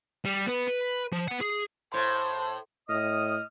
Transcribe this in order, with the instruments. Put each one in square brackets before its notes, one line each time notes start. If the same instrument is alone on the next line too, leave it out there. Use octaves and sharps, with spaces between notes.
[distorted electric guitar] G3
B3 B4
B4
F3
B3 F#5
G#4
[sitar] A2 [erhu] C5
[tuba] A2 [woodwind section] D#5 D#6 [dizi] F6